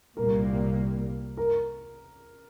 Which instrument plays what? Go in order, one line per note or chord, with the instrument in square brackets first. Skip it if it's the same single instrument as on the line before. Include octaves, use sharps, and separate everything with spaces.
[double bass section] C2 A#2 G3 A#3 [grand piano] A#4
[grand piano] A#4